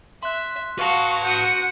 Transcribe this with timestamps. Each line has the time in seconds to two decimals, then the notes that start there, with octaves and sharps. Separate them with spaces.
0.23 E5 C6 F#6
0.79 F#4 B4 F5 F#5 A5
1.24 F#4 F#5 D#6 G6 C#7